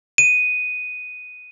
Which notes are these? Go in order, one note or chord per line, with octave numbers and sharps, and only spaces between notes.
D#7